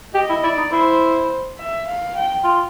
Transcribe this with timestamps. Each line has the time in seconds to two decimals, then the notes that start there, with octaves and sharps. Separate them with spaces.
0.14 G4 D#5
0.29 E4
0.43 E4 D5
0.57 D#4
0.72 E4 C5
1.59 E5
1.87 F5
2.16 G5
2.44 F4